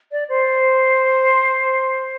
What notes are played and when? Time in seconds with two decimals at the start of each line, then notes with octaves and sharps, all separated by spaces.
0.12 D5
0.29 C5